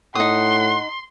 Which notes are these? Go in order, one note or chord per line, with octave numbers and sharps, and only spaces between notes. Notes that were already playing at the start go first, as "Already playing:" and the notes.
A2 D#4 F#5 C6 D#6